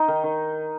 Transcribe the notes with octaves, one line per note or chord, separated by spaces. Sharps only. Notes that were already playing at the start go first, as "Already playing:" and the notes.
Already playing: D#4
D#3
D#3